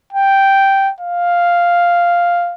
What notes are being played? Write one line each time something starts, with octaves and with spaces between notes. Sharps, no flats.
G5
F5